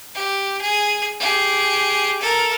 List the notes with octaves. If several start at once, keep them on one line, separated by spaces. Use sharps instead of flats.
G4
G#4
G4 G#4
A4 A#4